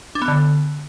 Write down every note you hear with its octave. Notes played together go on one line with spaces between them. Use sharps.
D4
B3
D3